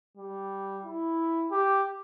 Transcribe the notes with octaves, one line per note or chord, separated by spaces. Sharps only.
G3
E4
G4